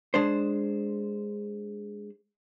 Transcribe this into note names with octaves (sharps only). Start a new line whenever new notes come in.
G#3 D4 C5